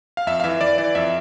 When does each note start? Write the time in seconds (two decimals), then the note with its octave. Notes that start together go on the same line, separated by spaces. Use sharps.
0.17 F5
0.27 F2 E5
0.40 F5
0.44 E3 E5
0.61 E3 D5
0.78 E3 D5
0.95 F2 E5